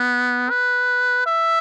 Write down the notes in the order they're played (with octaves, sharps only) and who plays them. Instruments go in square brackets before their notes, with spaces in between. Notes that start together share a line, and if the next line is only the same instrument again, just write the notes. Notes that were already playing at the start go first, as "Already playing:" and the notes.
Already playing: [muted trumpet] B3
B4
E5